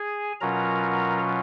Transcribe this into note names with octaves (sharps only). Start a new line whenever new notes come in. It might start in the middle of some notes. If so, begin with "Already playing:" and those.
Already playing: G#4 G#5
B2 F#3 C#4 F4 A#4 A#5